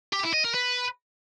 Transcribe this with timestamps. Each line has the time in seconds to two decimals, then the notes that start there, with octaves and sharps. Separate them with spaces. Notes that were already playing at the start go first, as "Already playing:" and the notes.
0.13 G4
0.23 E4
0.34 D#5
0.44 A#4
0.54 B4